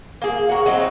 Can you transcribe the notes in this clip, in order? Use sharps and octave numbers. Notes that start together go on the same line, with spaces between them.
A#3 G#4
F#4 A#4
F#3 C4 D#4